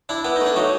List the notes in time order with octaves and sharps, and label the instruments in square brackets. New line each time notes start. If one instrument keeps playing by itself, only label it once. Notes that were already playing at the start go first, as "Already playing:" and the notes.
[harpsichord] D4 E4
B3 E4
A3 D#4
D4
F#3 D#4